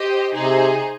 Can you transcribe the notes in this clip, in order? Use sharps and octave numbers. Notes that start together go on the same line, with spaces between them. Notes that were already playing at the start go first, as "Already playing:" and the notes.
Already playing: G4 C5 D#5
C3 D#4 G#4 C5